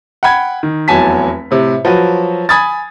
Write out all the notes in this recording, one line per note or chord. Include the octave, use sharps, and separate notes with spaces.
F#5 G5 B5 G#6
D#3
F1 E2 F#3 G#5 A5 B6
A2 C3
F3 F#3 F#4 B4
G#5 B5 D#6 G#6 A6